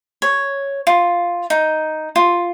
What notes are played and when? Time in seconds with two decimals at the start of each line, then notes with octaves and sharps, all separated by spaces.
0.22 C#5
0.87 F4
1.50 D#4
2.16 F4